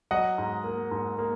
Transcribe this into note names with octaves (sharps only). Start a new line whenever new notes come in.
F#3 D#5 F#5
G#2
A#3
G#2
A#3